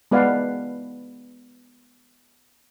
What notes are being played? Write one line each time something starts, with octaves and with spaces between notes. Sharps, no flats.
G#3 B3 B4 D5 F5 F#5